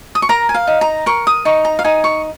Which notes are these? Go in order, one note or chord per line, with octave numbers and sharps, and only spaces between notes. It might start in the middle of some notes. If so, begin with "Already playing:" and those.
D#6
C#6
A#4 A#5
G#5
F5
D#4
A#5
A#4 C#6
D#6
D#4 C#6
A#5
F5
D#4 G#5
C#6